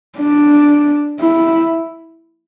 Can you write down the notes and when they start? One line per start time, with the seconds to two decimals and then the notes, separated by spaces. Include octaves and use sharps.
0.18 D4
1.20 E4